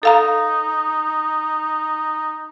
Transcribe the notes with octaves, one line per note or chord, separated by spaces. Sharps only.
D#4 A4 F5 A#5